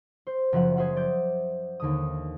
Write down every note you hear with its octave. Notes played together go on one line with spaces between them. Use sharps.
C5
F#1 F3 E5 F#5
G#4 C5 E5 F#5
D5 G6
D#2 D3 D#6